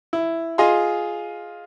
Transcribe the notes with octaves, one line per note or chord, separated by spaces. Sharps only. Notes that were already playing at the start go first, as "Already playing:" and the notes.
E4
F4 G#4 D#5 F5 C6